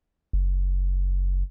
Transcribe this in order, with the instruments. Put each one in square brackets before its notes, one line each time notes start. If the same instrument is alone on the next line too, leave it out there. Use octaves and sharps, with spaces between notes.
[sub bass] F#1